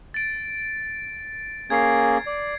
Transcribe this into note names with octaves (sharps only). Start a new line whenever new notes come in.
A6 D7
A#3 C#4 G#4 G#6 C7
D5